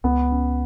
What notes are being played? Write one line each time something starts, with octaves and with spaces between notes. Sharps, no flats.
C#2 B3
C#4